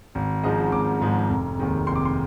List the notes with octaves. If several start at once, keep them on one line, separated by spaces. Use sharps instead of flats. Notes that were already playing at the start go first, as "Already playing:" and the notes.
G#1
G#2 F3 G#3 D#5
G#1 D6
G#2 F3 G#3
F1
D#2 D#3 G#3
F1 C6
D6
C6